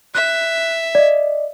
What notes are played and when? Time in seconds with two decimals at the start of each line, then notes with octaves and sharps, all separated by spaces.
0.15 E5 F#6
0.95 D5 D#5